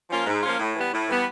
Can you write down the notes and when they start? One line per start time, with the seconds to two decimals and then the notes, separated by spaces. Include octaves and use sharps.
0.10 F3 A#3 C#4 F4
0.27 G#2
0.42 F3 A#3 C#4 F4
0.59 A2
0.76 E3 G3 B3
0.93 A2
1.09 E3 G3 B3